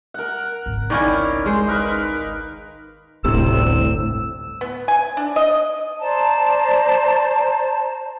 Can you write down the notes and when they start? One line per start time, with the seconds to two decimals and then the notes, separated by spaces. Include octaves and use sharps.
0.14 A#4 F#5
0.66 G#1 C#2
0.90 D#3 C#4 E4 D5 F5
1.46 G#3 C5
1.67 D#4 A#4 B4
3.24 G1 D2 A2 C3 E6
4.61 B3
4.88 G#5
5.17 D4
5.36 D#5
6.01 C5 D5 A5 A#5